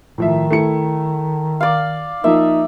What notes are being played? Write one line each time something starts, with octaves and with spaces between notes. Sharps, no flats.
A2 D#3 F3 E5
A3 E4 C#7
D5 F5
F3 A#3 D#4 E5